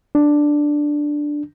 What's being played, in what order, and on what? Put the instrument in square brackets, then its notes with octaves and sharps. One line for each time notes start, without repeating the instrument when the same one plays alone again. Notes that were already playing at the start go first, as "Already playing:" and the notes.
[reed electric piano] D4